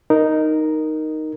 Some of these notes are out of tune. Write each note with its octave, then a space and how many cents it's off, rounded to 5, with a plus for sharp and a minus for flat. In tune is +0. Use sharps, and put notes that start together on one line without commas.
D#4 +0 A#4 +0